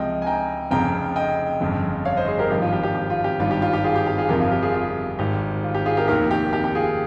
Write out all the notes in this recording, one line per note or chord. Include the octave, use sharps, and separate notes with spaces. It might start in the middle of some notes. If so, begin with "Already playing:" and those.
Already playing: C#2 C3 F3 D#5 G5
G#5
G5 A#5
F1 F2 C#3 F3 G5 A#5
D#5 G5
G1 F2 C#3 F3
C#5 F5
C5 D#5
G#4 C5
G4 A#4
G#1 G2 F3 G4
F4
G4
G4
G4
F4
G4
G#1 G2 D#3 F4
G4
F4
G4
F4 G#4
G4
G4
F4 G#4
G1 F2 C3 F3 G4 A#4
F4
G4
F4 G#4
F4 G#4
G#1 G#2 D#3 G4
F4
G4
F4 G#4
G4 A#4
F1 D#2 D#3 G4 A#4
G4
G4
G4
F4 G#4